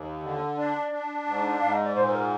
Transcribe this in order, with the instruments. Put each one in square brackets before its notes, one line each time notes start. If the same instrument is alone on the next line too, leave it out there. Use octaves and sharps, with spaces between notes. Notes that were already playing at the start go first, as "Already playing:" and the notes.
Already playing: [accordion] D#2
D3
[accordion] D4 [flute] D5
[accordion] D4
G#2
[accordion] G#2 [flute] F5
[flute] D#5
D5
[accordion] A#2 [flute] C5
[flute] C5
A#4